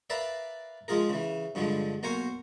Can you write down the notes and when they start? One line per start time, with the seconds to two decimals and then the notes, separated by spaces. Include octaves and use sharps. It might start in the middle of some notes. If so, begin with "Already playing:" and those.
0.10 A#4 B4 D5 E5 F5
0.88 F3 G#3 F4 G#4 A#4
1.09 C#3 E3
1.55 G2 D3 F3 G3 G#3
2.03 B1 A#3 A#4 C5 G#5 C#6